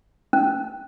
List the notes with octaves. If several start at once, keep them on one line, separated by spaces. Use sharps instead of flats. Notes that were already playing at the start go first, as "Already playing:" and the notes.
C#4